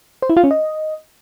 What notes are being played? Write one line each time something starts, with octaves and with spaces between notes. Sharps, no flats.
C5
E4
F4
C#4
D#5